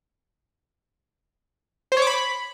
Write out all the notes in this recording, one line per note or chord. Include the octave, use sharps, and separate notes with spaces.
C5
C#5
D6
B5